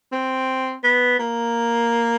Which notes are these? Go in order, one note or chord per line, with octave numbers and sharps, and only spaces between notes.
C4
B3
A#3